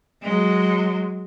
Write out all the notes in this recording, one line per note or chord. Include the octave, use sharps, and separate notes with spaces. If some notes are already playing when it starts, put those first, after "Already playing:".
F#3 G#3